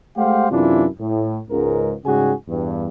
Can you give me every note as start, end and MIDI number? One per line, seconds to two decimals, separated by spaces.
0.17 0.49 56
0.17 0.49 57
0.17 0.49 67
0.17 0.49 72
0.17 0.49 77
0.17 0.49 78
0.51 0.86 42
0.51 0.86 48
0.51 0.86 52
0.51 0.86 62
0.51 0.86 64
0.51 0.86 65
0.99 1.39 45
1.51 1.92 37
1.51 1.92 44
1.51 1.92 70
2.05 2.33 44
2.05 2.33 49
2.05 2.33 55
2.05 2.33 66
2.05 2.33 68
2.05 2.33 80
2.48 2.89 40
2.48 2.89 43